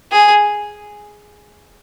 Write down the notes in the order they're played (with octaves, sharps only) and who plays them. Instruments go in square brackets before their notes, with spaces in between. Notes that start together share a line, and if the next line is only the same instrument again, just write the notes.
[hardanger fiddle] G#4